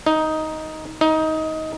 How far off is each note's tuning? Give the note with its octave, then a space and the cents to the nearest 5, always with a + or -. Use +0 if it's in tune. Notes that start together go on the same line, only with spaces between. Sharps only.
D#4 +10
D#4 +20